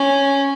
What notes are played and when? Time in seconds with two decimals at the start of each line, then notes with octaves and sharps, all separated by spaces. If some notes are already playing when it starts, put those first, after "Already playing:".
Already playing: C#4